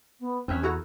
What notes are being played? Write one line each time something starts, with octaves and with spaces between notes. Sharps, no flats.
B3
E2 C4 C#4 E5
E4 F#4 A4 A#5